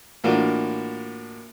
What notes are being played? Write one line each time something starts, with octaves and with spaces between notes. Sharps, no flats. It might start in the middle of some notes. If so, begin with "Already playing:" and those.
A2 E3 A#3 D4 F4 F#4